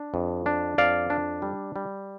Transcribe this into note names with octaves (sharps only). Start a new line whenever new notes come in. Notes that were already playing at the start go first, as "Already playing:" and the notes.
Already playing: D4
F2
D4
F2 D5 F5
D4
G3
G3